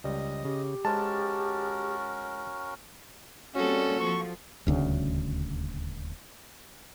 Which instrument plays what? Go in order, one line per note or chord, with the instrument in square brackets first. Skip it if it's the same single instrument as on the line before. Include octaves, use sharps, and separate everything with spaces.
[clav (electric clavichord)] C#2 G3 [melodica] D#5
[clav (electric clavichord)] C#3 [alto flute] G4
[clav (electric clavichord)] G#3 C5 [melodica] C#4 F#4 A#4 [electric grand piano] A5
[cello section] G3 A#3 C4 [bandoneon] C#4 [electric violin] F#4 A4
[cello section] F3 [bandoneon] C#6
[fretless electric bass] D#1 D2 C#3